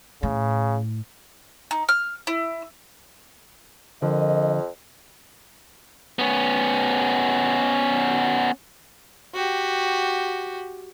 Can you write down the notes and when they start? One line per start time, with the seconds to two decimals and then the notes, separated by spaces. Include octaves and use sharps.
0.23 A2 C#3
1.71 D#4
1.89 F6
2.27 E4
4.02 F2 D3 F3 A#4 D#5
6.19 B3 C#4
9.34 F#4 G4